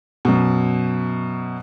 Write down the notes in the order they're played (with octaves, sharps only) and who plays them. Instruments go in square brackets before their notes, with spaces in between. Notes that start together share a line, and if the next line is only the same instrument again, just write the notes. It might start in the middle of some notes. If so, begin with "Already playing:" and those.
[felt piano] F#2 B2